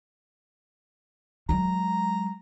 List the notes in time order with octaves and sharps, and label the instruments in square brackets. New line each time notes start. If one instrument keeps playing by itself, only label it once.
[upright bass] F#3 G#3 [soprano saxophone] A#5